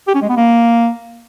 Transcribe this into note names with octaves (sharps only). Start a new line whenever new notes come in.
G4
C#4
G#3
B3
A#3